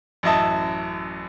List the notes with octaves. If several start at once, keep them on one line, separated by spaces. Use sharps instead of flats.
A1 F#2 E4 D#5 A5